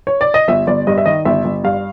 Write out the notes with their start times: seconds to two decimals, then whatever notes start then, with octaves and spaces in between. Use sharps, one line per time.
0.07 C#5
0.21 D5
0.34 D#5
0.48 G1 E5
0.67 G1 D5
0.87 G2 D#5
0.98 E5
1.06 D#3 D#5
1.25 G1 E5
1.45 G1
1.64 G2 F5